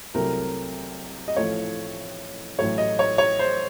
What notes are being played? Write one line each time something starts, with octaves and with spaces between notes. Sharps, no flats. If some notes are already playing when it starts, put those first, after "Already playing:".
C2 C3 F#3 A3 A#4
D#5
A1 A2 F3 A3 C#5
A1 A2 F#3 A3 C#5
D#5
C#5
C#5
C5